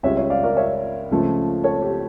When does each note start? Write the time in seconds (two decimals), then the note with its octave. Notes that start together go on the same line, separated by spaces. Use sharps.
0.03 C#2 C#3 G3 C#5 E5
0.17 C#5 E5
0.30 D5 F5
0.43 A#4 D5
0.57 C#5 E5
1.11 C#2 C#3 F3 A3
1.64 A4 C#5
1.82 G4